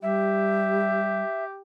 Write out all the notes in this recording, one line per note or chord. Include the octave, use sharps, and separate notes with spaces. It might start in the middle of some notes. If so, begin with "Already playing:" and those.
G3 G4 E5